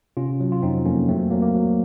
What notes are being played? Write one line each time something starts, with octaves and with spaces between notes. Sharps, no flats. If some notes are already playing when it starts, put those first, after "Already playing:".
C3 C#4 F4
F#3
F4
F2 C4 D#4
F2 A#3 C#4
F#3 A3 C4
A#3
F#3 A#3
A#3
F#3